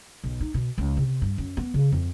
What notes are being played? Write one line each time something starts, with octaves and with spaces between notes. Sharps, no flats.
B1
D#4
B2
C#2
C3
G2
F#2
B3
C#3
F2